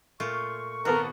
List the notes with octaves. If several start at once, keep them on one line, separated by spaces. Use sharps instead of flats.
A#2 A3 F4 C#6
G#1 B3 F#4 A4 A#4